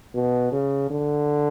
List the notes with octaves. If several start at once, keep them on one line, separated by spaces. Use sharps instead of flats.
B2
C#3
D3